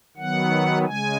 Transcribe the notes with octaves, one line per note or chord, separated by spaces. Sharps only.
D#3 F#3 B3 F#5
C#3 G#3 G#5